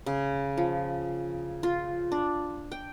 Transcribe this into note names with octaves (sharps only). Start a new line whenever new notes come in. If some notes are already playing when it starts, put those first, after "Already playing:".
C#3
F3
F4
D4
G5